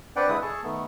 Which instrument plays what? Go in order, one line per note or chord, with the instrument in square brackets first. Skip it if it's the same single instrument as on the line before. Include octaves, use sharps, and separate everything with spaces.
[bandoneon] C4 D4 B4 D5 F#5 G5
D3 G#3 E4 B4 D#6
G#4 A4 A5 C#6
D#3 A3 B3